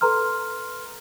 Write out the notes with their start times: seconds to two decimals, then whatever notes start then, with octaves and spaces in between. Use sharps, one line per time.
0.01 A4 B4 A#5 C6 F6